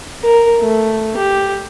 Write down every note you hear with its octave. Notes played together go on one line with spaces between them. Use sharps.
A#4
A3
G4